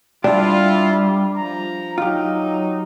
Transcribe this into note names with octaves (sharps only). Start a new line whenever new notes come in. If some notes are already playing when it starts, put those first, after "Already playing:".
G3 D4 E4 F4 G4
F3 A#5
F#3 D#4 F4 G4